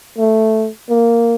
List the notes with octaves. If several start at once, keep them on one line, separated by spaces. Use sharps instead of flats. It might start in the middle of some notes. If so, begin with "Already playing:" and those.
A3
A#3